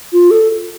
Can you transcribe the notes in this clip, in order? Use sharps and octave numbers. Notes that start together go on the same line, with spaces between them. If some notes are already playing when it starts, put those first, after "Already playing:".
F4
A4